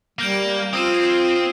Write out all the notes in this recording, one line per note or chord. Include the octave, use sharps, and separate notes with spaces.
G3 A#3 F6 G6 D7
C4 F4 D#6 E6 D#7
G#6 C7